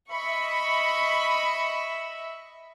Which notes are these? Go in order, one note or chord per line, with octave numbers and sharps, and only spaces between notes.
D#5 E5 B5 C#6